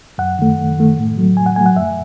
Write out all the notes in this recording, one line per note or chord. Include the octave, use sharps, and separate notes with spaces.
F#2 F#5
D#3 A3
F#2
D#3 A3
A2
F#3 A3
A2 G#5
F#5
F#3 A3 G#5
F#5
F#2 E5